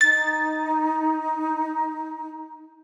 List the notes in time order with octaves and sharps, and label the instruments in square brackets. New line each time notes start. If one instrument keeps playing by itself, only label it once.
[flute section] D#4 [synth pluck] A6